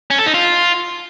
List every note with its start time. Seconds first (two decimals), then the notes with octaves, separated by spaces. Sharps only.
0.10 C#4
0.18 A4
0.26 D#4
0.34 F4